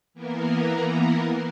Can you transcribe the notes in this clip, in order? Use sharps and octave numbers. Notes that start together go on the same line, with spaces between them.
E3 A#3 B3 A#4